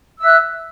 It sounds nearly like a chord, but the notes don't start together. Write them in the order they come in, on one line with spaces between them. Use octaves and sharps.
E6 E5 F#6